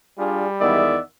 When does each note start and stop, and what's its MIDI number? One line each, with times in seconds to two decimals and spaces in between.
0.18 0.81 55
0.18 0.46 62
0.18 0.46 65
0.18 0.46 68
0.61 0.95 40
0.61 0.98 51
0.61 0.95 56
0.61 0.98 59
0.61 0.95 64
0.61 1.01 74
0.61 0.98 76